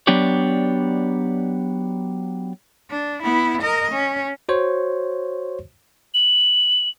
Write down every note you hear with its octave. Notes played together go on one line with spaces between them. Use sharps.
F#3 B3 D4 G4 C#5 D5
D4
B3 E4
A#4 D#5
C#4
F#4 C5 C#5
F#7